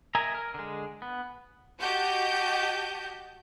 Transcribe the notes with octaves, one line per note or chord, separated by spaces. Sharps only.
A#4 D#5 E5 G#5 A#5
A#4
D3 G#3
B3
F#4 G4 D#5 A5 G6